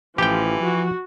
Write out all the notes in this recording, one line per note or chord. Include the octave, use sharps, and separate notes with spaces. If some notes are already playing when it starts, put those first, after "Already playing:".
A1 E3 F3 G4 G5
F3 F#4